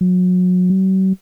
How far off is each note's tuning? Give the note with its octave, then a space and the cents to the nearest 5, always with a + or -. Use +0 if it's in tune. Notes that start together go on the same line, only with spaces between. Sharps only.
F#3 -30
F#3 +45